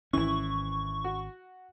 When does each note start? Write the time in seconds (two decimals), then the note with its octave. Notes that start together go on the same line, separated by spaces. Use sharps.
0.13 G#1 E3 C#4 E4 C#6
1.04 F#4